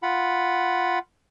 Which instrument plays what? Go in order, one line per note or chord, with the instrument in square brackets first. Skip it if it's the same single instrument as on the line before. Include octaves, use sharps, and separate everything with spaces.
[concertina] F4 F#5 B5